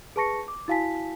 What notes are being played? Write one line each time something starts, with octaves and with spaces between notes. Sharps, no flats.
G#4 B4 A5 C#6 A#6 C#7
D6
E4 F#4 F5 G#5 A5 B6